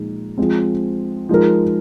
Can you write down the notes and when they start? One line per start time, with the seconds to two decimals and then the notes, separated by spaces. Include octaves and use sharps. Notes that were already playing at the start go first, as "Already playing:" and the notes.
Already playing: A#2 F3 G#3 D#4 G#4
0.38 F3 G#3 C4
1.29 F3 G#3 D#4 A#4